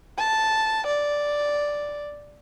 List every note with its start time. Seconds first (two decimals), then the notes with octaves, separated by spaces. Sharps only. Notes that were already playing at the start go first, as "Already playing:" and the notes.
0.18 A5
0.87 D5